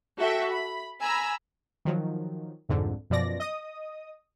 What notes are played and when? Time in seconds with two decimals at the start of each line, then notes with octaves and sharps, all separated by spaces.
0.19 F#4 A4 E5 G5
0.50 B5
1.02 G#5 A#5 B5 E6
1.85 D#3 F3 F#3
2.69 C2 F2 G#2 D3
3.10 F#2 B2 F3 D5 A#6
3.40 D#5 D#6